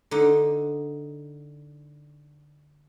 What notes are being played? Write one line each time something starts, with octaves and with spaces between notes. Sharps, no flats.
D3 D#4